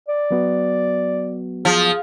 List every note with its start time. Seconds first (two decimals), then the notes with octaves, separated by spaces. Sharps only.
0.09 D5
0.31 F#3 B3 F#4
1.65 F3 G#4